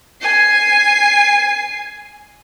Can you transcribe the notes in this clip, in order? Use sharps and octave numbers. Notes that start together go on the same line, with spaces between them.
G#5 C7